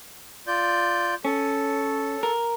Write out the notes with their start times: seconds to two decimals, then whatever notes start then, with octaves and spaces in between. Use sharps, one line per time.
0.47 F4 D5 G6
1.25 C#4 A4
2.23 A#4